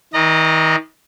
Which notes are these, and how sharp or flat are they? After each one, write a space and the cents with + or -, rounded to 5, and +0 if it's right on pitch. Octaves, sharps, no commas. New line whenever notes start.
D#3 +40 D#5 -35 A#5 +0